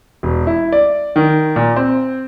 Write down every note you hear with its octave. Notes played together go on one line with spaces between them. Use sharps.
E1
E4
D5
D#3
A#2
C4